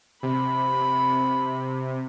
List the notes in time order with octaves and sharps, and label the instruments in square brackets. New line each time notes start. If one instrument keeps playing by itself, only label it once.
[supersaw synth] C3 [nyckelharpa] B5